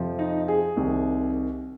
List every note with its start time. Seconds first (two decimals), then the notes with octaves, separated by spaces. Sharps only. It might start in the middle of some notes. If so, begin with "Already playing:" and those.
Already playing: F2 C3 F3
0.19 D#4
0.48 G#4
0.76 C2 C3 D#3